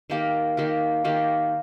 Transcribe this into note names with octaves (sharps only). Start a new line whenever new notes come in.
D#3 A#3 G4 A#4
D#3 A#3 G4 A#4
D#3 A#3 G4 A#4